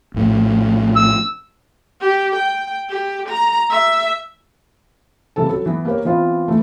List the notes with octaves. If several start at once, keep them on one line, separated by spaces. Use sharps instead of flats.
A#1 A2
E6
G4
G5
G4
A#5
E5
C#2 C3 E3 A4 A5
F#3 A4
E3 B3
A#3 G4 A#4 C#5
E3 B3 C4 F4
E3 A3